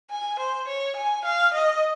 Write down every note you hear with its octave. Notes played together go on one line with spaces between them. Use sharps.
G#5
C5
C#5
G#5
F5
D#5